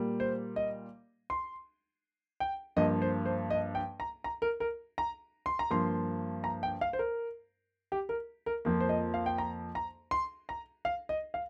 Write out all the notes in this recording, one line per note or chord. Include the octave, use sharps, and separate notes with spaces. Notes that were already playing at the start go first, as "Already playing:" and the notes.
Already playing: A#2 G3 A#3
C5
D#5
C6
G5
G2 F3 A#3 D#5
C5
C5
D#5
G5
A#5
A#5
A#4
A#4
A#5
C6
A#5
G2 F3 A#3 C6
A#5
G5
F5
C5
A#4
G4
A#4
A#4
F2 F3 A#3
C5
D#5
F5
G5
A#5
A#5
C6
A#5
F5
D#5
F5